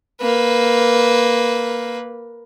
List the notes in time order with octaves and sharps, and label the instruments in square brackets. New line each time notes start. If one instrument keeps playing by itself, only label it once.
[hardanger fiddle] A#3 B4